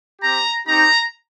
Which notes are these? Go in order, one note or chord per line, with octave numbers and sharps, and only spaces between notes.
C4 G4 A#5
C4 D#4 G4 A#5